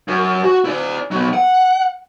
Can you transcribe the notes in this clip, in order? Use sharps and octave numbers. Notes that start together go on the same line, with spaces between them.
F#2
F#4
E4 D5
F#3 B3
F#5